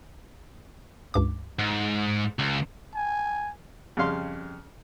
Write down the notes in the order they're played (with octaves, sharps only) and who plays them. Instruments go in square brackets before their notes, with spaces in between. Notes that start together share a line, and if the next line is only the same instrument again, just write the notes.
[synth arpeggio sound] C#2 G2 D6
[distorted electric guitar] G#2
C#2
[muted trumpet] G#5
[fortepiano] F2 C#3 G3 F5 C6